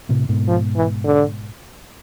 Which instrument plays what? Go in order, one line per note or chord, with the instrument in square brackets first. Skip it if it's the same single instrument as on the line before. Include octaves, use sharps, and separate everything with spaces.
[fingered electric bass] A2 C3
G#2 B2
[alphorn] F3
E3
D3